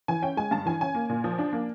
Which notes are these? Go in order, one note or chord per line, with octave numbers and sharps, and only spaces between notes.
E3 G#5
C#4 G5
G#3 G#5
G2 A5
E3 G#5
C#4 G#5
A#3
A#2
F3
D4
A#3